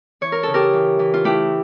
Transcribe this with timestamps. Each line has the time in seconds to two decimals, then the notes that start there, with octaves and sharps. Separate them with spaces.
0.21 E3 C#5
0.32 A#4
0.43 C#3 A4
0.54 G4 A#4
0.73 E3
0.99 E3
1.14 F4
1.24 A3 E4 G4